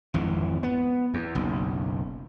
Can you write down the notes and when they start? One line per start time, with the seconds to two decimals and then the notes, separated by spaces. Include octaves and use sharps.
0.14 G#1 F2 E3
0.63 B3
1.14 E2
1.35 F#1 B1